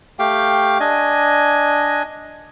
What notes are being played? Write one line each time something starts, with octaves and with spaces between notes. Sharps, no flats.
A3 G4 F5 G5
D4 D#5 G#5